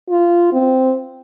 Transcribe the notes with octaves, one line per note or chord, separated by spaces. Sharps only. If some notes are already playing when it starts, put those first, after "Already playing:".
F4
C4